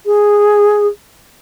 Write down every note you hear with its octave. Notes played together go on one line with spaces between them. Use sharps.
G#4